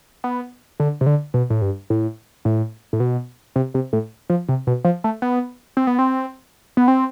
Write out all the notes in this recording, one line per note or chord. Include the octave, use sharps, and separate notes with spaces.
B3
D3
C3
D3
B2
A2
G2
A2
A2
A2
B2
C3
C3
A2
F3
C3
B2
F3
A3
B3
C4
B3
C4
B3
C4